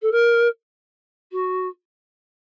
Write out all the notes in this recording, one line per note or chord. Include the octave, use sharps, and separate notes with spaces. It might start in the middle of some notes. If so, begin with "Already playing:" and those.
A4
A#4
F#4